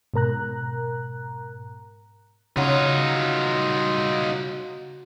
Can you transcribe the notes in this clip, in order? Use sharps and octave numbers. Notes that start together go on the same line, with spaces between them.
G#2 B2 A#4 A#5 F#6
C#3 F#3 D#4 F4